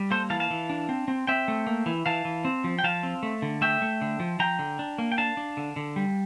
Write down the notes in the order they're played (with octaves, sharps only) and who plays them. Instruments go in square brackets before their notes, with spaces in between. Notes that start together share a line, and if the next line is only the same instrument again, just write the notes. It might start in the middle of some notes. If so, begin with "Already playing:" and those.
Already playing: [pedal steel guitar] G3
A#3 A4 C5
E3 F5 A5
F5 A5
E3
D4
C4
C4
C4 E5 G5
A3
A#3
E3
E3 F5 A5
E3
C4
F3
G5
F3 F5 A5
C4
A3
D3
A3 E5 G5
A3
D3
F3
F3 G5 A#5
D3
D4
A#3
G5
D4 F5 A5
D4
D3
D3
G3